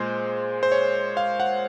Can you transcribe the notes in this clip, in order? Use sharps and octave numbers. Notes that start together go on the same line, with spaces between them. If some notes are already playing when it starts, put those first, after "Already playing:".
Already playing: A#2 G#3 C5
C5
C#5
F5
F#5